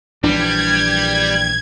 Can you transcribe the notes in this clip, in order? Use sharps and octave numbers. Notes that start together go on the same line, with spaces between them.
A#1 E3 G3 D4 G#6